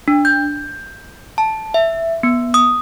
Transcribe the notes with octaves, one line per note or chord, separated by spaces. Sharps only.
D4
G6
A5
E5
B3
D#6